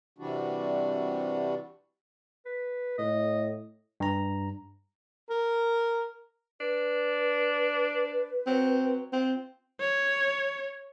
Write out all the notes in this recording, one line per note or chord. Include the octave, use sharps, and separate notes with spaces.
C3 E3 G3 D4 F#4
B4
A2 D#5
G2 A#5
A#4
D4 B4
F#3 C4
C4 F4
C#5